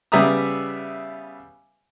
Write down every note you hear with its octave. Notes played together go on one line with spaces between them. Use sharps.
C#3 G3 B3 E5 A#5 D#6